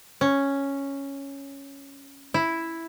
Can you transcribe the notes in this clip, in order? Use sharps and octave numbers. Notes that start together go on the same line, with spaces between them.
C#4
E4